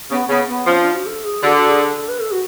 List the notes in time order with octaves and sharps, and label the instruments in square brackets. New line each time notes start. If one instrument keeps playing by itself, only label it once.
[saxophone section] C#3 [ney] B3
[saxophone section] C#3 [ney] B3
[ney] B3
[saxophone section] F3 [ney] C#4
[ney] D4
F#4
A4
G#4
[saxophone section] D3 [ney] F#4
[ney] F#4
G#4
A4
B4
A4
F#4